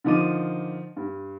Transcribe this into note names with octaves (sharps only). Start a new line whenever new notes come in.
D3 D#3 F3 D#4 D6 D#7
G2